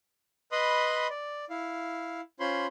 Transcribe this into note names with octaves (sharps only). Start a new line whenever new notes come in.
B4 D#5 B5 C6 D#6
D5
E4 F5
C#4 F4 C5 C#5 B5 C6